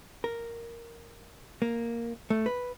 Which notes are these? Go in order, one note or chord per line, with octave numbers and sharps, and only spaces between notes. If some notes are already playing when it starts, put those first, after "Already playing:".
A#4
A#3
A3
B4